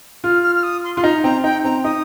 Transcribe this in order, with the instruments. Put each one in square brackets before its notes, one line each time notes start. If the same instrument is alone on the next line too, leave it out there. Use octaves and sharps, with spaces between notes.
[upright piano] F4 [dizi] F6
[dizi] F6
F6
D#6
C6
[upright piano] F4 [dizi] C6
[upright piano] D#4 [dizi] A#5
[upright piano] C4 [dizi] A#5
[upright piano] D#4 [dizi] G5
[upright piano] C4 [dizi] A#5
[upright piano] D#4 [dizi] D#6